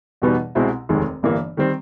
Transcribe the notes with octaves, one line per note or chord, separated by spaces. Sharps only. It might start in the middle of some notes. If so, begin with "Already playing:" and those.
E2 B2 G3 B3 D#4
C2 B2 G#3 C4 E4
F1 D#2 D#3 G#3
G1 G2 E3 G3 A#3
D#3 G3 C4